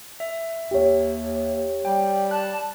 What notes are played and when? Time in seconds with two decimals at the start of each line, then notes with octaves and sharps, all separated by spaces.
0.20 E5
0.71 D#2 G4 C#5
1.85 G3 G5
2.31 A5 F#6